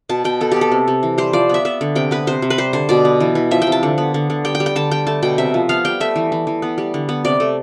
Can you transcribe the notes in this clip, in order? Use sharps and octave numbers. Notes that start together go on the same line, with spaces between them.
B2 A5
B2 G5
B3 A4
B3 G4
A4
C3
C3
E3
G3 C5
F3 D5
B3 E5
B3 E5
D3
C3 G5
B3 B4
C3 C5
C3
B4
G3 C5
D3 C5
B2 D5
B3
E3
E3
F3 E5
G5
C3
A5
D3
B3
D3
D3
G3 G5
G5
G3
G5
D3 A5
G3 G5
A3 A5
B2 G5
C3 E5
F3
B3 F5
G3 G5
A3 E5
E3
E3
E3
B3
G3
D3
B3
C3 D5
A3